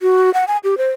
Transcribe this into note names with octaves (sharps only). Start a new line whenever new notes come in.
F#4
F#5
G#5
G4
C5